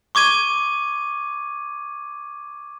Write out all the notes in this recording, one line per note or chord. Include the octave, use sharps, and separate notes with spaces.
C#6 D6 G#6 D#7